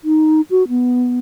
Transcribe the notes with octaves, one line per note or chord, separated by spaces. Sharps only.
D#4
F#4
B3